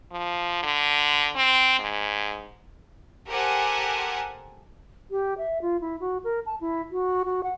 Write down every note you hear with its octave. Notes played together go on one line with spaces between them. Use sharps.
F3
D3
C4
G#2
G4 A4 A#4 C5 F#5 G#5
G4
E5
F4
E4
F#4
A#4
A5
E4
F#4
F#4
F#5